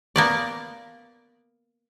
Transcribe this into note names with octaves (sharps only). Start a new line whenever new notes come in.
A#3 B3 D5